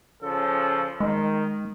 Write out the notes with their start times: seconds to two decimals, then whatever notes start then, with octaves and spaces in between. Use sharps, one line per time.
0.22 C#3 F3 A4
1.00 D#3 G#3